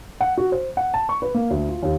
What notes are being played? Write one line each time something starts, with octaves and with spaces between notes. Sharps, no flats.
F#5
F#4
C5
F#5
A5
C#6
B4
A#3
D2
F4
D#2